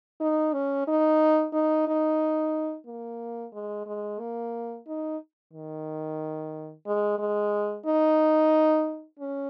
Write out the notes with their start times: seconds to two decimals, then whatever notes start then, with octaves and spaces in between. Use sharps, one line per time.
0.20 D#4
0.53 C#4
0.88 D#4
1.53 D#4
1.87 D#4
2.86 A#3
3.53 G#3
3.86 G#3
4.19 A#3
4.87 D#4
5.53 D#3
6.86 G#3
7.19 G#3
7.86 D#4
9.19 C#4